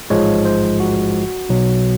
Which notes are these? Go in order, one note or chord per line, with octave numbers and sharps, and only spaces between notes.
A1 G#2 F3 G#3 C#5
C5
F#4
B1 B2 F#3